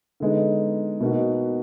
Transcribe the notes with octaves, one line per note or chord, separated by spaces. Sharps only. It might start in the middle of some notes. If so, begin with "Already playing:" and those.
D3 G#3 B3 D#4
B2 A#3 D#4 F#4